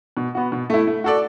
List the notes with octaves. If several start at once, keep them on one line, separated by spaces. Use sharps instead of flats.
B2
B3 F#4
B2
A3 E4
A3
F#4 A4 D5